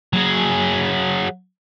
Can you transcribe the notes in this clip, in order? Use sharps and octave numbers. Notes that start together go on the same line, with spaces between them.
F#3 G#4